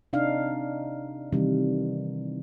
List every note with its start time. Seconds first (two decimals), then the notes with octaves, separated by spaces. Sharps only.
0.13 C3 D4 D#4 F5
1.33 C3 D#3 E3 G3